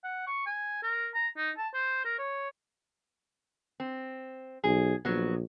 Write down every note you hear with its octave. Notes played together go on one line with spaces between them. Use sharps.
F#5
C#6
G#5
A#4
A#5
D#4
A5
C5
A#4
C#5
C4
B1 G#4
A#1 F#3 B3